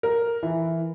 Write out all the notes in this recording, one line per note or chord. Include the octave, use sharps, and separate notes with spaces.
A#4
E3